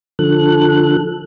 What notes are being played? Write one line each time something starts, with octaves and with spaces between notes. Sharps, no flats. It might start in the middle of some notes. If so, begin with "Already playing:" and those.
D3 F3 A4 F#6